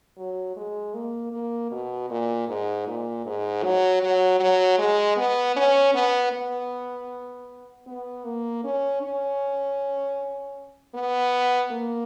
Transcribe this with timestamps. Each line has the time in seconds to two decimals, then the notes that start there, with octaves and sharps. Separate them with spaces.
0.17 F#3
0.57 G#3
0.94 A#3
1.32 A#3
1.71 B2
2.10 A#2
2.49 G#2
2.87 A#2
3.25 G#2
3.63 F#3
4.03 F#3
4.40 F#3
4.78 G#3
5.17 B3
5.56 C#4
5.94 B3
6.33 B3
7.87 B3
8.25 A#3
8.64 C#4
9.02 C#4
10.94 B3
11.71 A#3